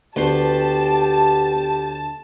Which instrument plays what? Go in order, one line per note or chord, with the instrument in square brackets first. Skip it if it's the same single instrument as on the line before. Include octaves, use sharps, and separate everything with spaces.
[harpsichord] D2 C5 [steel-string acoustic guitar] B3 [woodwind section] G4 [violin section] A5